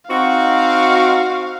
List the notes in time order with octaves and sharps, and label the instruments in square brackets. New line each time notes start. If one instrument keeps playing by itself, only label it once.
[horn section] C4 D#4 F#4 [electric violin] F5